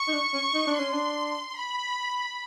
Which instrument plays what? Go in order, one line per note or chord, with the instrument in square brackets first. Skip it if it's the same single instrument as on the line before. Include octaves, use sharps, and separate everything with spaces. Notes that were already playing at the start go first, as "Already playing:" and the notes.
Already playing: [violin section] C#6
[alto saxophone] D#4
D4
C#4
D#4
D4
[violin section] C6
[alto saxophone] C#4
D4
[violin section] B5